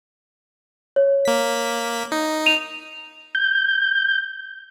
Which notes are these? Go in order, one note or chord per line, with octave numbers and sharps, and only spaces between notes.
C#5
A#3 B6
D#4
D#7 F7
G6